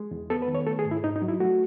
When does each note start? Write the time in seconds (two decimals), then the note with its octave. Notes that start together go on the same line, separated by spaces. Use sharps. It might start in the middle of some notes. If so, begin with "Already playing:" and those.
Already playing: G#3
0.11 E2
0.30 B3 A4
0.42 B4
0.48 D#3
0.55 C#5
0.67 A3 A4
0.79 G#4
0.85 G#2
0.91 E4
1.04 G#2 D#4
1.16 D#4
1.22 F#3
1.28 E4
1.40 A3 F#4